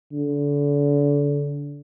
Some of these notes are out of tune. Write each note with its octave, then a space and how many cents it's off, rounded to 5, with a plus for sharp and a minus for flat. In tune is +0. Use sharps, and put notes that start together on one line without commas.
D3 -30